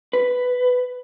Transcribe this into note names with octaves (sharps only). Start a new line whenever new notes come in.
B4